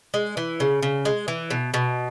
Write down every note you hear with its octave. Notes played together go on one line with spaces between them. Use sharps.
G#3
E3
C#3
C#3
G#3
E3
B2
B2